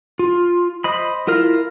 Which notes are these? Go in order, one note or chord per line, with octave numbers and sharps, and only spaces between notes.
F4
C5 D#5 B5
E4 F4 A#4 F5